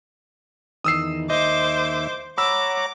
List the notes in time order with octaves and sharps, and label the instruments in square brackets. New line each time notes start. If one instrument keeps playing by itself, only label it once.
[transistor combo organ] E2 D#3 [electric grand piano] D#6 E6 C7
[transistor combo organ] D#2 E5 [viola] C5 D6 [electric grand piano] D#5
[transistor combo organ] C#5 F#5 A#5 [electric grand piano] B5 E6 [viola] D6